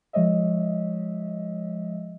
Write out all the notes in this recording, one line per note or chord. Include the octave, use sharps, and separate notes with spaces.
F3 G#3 C#5 D#5 E5